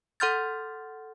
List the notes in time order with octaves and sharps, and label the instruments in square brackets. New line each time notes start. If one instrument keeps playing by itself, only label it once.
[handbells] A4 F#5 C6 F6 G6 A6